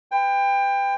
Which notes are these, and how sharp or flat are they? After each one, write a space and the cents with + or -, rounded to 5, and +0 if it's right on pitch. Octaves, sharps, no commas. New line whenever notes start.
B4 +35 G5 +25